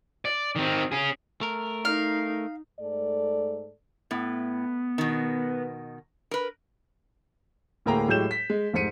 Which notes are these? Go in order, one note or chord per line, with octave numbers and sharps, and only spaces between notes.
D5
D#3 C4
C#4 G#4
A3 A#4
D#4 F5
G#2 A3 A4 D5
A2 B3
B2 D#3
A#4 B4
D2 A2 A#3 G#4 G5 A#5
A2 F#3 G#3 G4 G6 E7
B6
G#3
F1 G#2 C5 B6 C#7 D#7